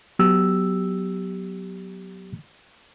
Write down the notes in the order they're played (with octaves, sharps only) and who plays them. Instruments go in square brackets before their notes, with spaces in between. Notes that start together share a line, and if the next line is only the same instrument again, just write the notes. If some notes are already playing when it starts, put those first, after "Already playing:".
[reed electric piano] F#3 B3 G4 E6